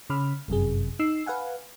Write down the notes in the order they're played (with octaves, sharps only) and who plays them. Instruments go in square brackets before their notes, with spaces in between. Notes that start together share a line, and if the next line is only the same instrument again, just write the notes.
[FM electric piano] C#3 C#4 B5 F6
G1 F#2 C3 G#4
D#4 E6 C7
B4 F5 F#5 G#5